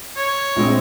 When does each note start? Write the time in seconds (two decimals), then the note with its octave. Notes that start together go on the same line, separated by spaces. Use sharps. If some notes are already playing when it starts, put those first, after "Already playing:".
0.16 C#5
0.56 A#1 G#3 C4